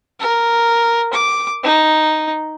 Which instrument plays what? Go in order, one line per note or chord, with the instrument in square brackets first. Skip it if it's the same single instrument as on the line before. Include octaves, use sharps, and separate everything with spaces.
[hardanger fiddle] A#4
D6
D#4